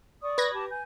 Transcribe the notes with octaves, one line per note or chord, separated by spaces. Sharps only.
D5 C#6 D#6
B4 G#6 A#6
G4 A5 D6
G#5 G6